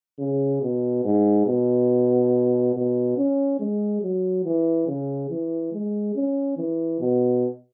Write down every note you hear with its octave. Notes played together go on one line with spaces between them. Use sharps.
C#3
B2
G#2
B2
B2
C#4
G#3
F#3
E3
C#3
E3
G#3
C#4
E3
B2